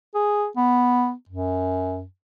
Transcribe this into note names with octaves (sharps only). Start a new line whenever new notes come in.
G#4
B3
F#2